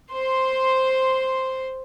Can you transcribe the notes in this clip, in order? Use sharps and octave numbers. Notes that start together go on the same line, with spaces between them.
C5 C6